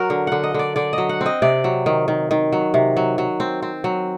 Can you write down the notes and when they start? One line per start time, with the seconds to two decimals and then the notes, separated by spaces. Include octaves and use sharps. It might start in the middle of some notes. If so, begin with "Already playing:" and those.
Already playing: F#3 F#4 A#4
0.10 D3
0.27 D3 F#5
0.44 D#5
0.54 D3 D5
0.76 D3 D5
0.93 D#5
0.98 F#3
1.09 F#5
1.21 C4 D#5
1.42 C3 D5
1.64 F#3
1.86 D#3
2.08 D#3
2.31 D#3
2.53 F#3
2.74 C3
2.97 F#3
3.18 F#3
3.40 C4
3.62 C4
3.84 F#3